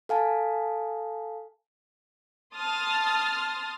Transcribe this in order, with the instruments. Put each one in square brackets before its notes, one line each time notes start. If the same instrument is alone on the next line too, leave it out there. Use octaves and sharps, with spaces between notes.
[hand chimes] A4 F5 G#5 A5
[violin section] A5 C6 D#6 F6